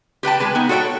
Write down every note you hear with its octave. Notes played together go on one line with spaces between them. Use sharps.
G4 B4 G5 A5
G#3 G#4 B4
B3 D#4
F#4 A4 C#5 E5 G5